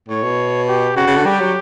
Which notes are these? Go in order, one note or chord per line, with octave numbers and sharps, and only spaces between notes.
A2 C#5
B2
G4
C#3 F#4
C#3
D3
G3 G4
F#3